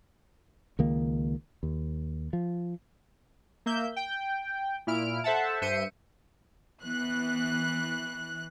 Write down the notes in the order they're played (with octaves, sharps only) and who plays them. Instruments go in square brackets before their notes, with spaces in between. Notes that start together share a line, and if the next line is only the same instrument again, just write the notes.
[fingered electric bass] C#2 D#3 A#3
D#2
F3
[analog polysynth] A#3 E5 G6
G5
A#2 E4 F6 D7
A4 C5 E5 F#5 A5
G2 C5 E5 C#7 D#7
[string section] E3 F#6 [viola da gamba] B3